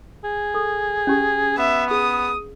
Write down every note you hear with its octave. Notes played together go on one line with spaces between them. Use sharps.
G#4
A4
C#4 G4
B3 E5
G#4 D#6